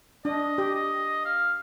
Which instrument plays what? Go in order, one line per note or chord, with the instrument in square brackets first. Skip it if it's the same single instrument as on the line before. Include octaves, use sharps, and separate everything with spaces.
[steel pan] D4 [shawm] D#5
[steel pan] G4
[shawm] D#5
F5